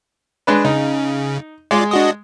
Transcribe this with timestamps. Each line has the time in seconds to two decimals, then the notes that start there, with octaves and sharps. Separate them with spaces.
0.47 G#3 D4 B4
0.65 C#3 D#4
1.71 G#3 F4 D5
1.91 D4 F#4 D#5